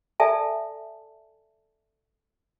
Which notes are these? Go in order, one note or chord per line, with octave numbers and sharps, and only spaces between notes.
A4 D5 E5 G#5 A5